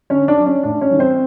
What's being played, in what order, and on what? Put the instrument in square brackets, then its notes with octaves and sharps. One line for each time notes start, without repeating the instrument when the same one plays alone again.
[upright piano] D3 C#4 C#5
D4 D5
F#3
C#4 C#5
A2 D4 D5
C#4 C#5
E3 G3
C4 C5